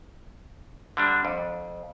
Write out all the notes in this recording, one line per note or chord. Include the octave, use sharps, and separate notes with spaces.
D3 G3 D4
F2